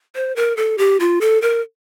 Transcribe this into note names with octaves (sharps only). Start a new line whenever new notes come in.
C5
A#4
A4
G4
F4
A4
A#4